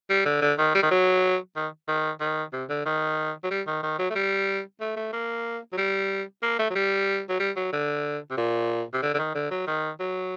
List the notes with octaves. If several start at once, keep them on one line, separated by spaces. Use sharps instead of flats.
G3
D3
D3
D#3
G3
D#3
F#3
D#3
D#3
D#3
C3
D3
D#3
F#3
G3
D#3
D#3
F#3
A3
G3
A3
A3
A#3
F#3
G3
A#3
A3
F#3
G3
F#3
G3
F#3
D3
C3
A#2
C3
D3
D3
D#3
D3
F#3
D#3
F#3